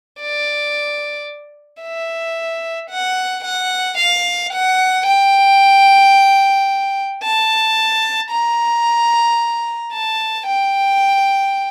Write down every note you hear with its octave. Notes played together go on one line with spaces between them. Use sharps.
D5
E5
F#5
F#5
F5
F#5
G5
A5
A#5
A5
G5